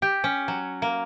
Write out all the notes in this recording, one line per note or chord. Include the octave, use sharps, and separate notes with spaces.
G4
C#4
F#3
A#3